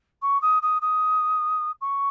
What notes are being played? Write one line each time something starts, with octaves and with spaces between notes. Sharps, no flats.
C#6
D#6
D#6
D#6
C#6